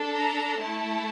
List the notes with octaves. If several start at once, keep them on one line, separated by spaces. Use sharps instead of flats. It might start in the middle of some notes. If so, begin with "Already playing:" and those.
Already playing: D4 A4
A#5
A3 E4 A4 A5